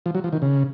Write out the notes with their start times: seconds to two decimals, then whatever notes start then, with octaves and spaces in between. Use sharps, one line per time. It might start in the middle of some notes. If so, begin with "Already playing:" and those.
0.06 F3
0.15 F#3
0.24 F3
0.33 D#3
0.42 C#3